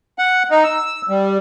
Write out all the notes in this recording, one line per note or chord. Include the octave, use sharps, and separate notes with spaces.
F#5
D#4
E6
G3